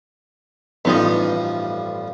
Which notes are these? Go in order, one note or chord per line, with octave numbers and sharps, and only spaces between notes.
A1 G2 F3 B3 D#4 F4